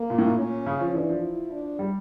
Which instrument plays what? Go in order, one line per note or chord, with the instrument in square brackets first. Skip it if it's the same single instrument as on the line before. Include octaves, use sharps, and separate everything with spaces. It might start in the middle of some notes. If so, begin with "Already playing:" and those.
Already playing: [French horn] A#3
[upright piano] A#2
A2
A#2
[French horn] C#4
[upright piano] C#3
F3
[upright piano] E3 [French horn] D4
[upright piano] F3
[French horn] E4
D4
[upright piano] G3